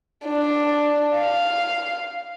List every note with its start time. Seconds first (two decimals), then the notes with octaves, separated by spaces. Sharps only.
0.25 D4
1.17 F5